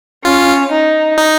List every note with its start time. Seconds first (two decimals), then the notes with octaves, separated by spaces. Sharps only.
0.25 C#4 F4
0.71 D#4
1.18 D#4